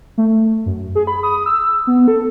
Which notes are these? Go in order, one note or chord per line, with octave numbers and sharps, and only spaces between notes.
A3
F#2
G#4
B5
D#6
E6
B3
A4